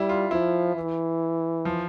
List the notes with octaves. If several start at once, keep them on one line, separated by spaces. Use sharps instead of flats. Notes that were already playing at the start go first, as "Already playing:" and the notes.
Already playing: G3 E4
F4
F3 E4
E3
F3